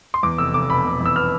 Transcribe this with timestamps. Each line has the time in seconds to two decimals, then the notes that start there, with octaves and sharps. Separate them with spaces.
0.14 C6
0.23 E2 D6
0.38 F1 E6
0.54 F1 D6
0.70 B2 B5
0.85 F1
1.01 E2 E6
1.16 B3 F6